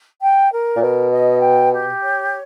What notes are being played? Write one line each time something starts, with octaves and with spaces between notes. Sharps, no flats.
G5
A#4
A#2
B2 A#4
D#5
G5
G4
C#5